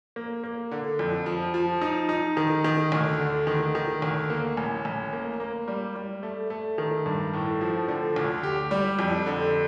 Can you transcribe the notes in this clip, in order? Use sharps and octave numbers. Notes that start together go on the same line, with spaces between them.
A#3
A#3
D3
F2
F3
F3
D#4
D#4
D#3
D#3
D2
D3
D#3
D#3
D2
A#3
A1
A1
A#3
A#3
G3
G3
A3
A3
D#3
G2
A2
F3
D3
D2
G4
G3
F2
D3